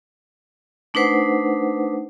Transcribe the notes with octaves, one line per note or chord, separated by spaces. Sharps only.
A3 D4 D#4 B4 C5 F#5